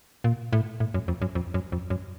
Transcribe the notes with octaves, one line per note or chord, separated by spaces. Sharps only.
A#2
A2
A2
F#2
F2
F#2
F2
F#2
F2
F#2